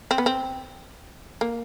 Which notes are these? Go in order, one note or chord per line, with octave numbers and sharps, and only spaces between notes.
C4
B3
C4
A#3